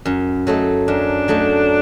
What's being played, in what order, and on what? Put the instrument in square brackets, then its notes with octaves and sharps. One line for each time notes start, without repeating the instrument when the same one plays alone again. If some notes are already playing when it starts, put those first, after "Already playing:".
[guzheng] F#2
F#3 A3 D#4
[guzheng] F#2 [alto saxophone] D4
[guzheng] F#3 A3 D#4